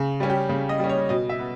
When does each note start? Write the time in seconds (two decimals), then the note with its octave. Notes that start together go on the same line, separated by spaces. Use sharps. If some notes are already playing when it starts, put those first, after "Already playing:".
Already playing: C#3
0.20 G3 C#4
0.30 G4
0.49 C#3
0.69 D#5
0.79 G3 C#4
0.89 C#5
1.09 B2 D#5
1.29 E5
1.39 B3